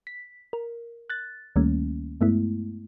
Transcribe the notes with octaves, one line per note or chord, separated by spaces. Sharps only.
B6
A#4
F#6 A6
D2 D#3 G3 A3 A#3 C#4
G2 G#3 A3 B3 E4